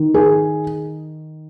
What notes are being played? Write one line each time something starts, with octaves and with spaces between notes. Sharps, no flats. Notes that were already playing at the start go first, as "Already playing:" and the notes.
Already playing: D#3
G#4